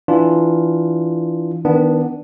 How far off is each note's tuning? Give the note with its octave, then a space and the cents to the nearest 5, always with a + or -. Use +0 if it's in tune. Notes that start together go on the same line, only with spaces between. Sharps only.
E3 +5 D4 +0 F4 +0
D#3 +25 B3 +0 D4 +0